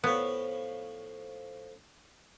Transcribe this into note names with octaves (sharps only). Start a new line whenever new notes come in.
A2 F3 B3 C#5